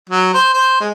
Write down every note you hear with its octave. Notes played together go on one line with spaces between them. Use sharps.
F#3
C5
C5
G#3